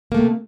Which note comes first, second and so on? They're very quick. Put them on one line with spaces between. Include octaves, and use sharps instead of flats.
A#3 A3 C3